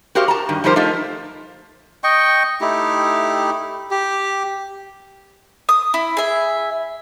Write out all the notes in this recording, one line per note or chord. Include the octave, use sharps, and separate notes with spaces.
F#4 G4 A#4 C5 F5
A5 A#5
G2 D#3
F3 G3 D#4 G4 A#4 C5
F3 A3 D#4 F4
D#5 G5 C#6
A3 D#4 E4 G4
G4
D#6
E4
G#4 E5